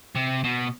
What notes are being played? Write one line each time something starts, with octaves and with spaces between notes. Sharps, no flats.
C3
B2